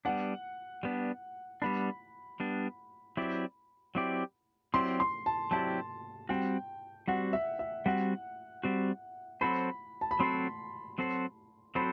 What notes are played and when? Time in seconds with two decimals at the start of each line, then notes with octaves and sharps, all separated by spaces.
0.05 G3 B3 D4 F#5
0.83 G3 B3 D4
1.62 G3 B3 D4 B5
2.40 G3 B3 D4
3.17 F#3 C4 E4 G4 D5
3.95 F#3 C4 E4 G4 D5
4.74 F#3 C4 E4 G4 D5 C6
5.00 C6
5.26 A5
5.51 F#3 C4 E4 G4 D5 A5
6.29 G3 C4 F#4 G5
7.08 G3 C4 F#4 F#5
7.33 E5
7.59 E5
7.86 G3 C4 F#4 F#5
8.64 G3 C4 F#4
9.41 F#3 C4 F#4 A4 C5 B5
10.01 A5
10.11 B5
10.19 F#3 C4 F#4 A4 C5 C6
10.98 F#3 C4 F#4 A4 C5
11.75 F#3 C4 F#4 A4 C5 B5